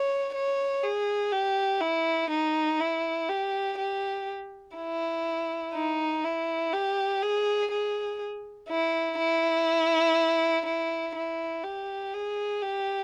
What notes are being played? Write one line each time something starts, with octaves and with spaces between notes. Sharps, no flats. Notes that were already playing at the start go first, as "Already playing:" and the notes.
Already playing: C#5
C#5
G#4
G4
E4
D#4
E4
G4
G4
E4
D#4
E4
G4
G#4
G#4
E4
E4
E4
E4
G4
G#4
G4